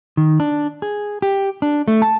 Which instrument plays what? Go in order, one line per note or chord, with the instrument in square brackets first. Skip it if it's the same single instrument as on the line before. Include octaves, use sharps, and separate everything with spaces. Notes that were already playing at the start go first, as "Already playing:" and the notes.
[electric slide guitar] D#3
D4
G#4
G4
D4
A3
A5